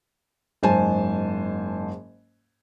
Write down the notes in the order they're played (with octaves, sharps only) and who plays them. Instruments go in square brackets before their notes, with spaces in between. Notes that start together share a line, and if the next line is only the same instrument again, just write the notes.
[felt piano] F#1 G#2 C5 G#5 A5